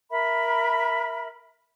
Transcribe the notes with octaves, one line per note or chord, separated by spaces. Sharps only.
A#4 E5 B5